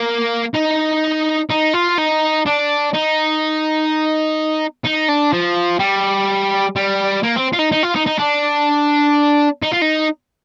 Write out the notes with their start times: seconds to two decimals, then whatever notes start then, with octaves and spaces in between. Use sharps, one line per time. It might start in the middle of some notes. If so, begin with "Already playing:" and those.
Already playing: A#3
0.55 D#4
1.50 D#4
1.74 F4
1.98 D#4
2.46 D4
2.93 D#4
4.84 D#4
5.08 D4
5.33 F3
5.80 G3
6.76 G3
7.23 A#3
7.36 C4
7.53 F4
7.59 D#4
7.72 D#4
7.83 F4
7.96 D#4
8.07 D#4
8.19 D4
9.63 D#4
9.73 F4
9.82 D#4